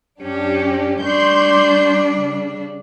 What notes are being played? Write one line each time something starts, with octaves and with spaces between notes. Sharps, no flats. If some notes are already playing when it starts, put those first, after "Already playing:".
F#2 C#4 D4 G4
G3 D4 C6 C#6 G6
C#3